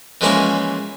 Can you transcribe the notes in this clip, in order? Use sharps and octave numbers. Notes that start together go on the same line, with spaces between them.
E3 F3 G#3 A#3 C#4 E4